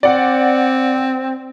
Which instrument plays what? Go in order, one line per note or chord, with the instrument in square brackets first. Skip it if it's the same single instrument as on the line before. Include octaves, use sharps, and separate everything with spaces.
[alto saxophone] C4 [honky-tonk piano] D5 F#5